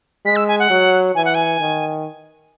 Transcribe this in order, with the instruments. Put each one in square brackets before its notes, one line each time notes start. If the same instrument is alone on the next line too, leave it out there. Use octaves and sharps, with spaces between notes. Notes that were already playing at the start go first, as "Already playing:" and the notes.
[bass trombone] G#3 [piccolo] B6
[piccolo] E6
G#5
F#5
[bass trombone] F#3
[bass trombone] E3 [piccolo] G#5
[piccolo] F#5
G#5
[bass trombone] D#3